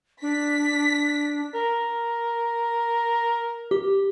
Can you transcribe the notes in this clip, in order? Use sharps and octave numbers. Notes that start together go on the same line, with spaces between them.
D4 B6
A#4
G4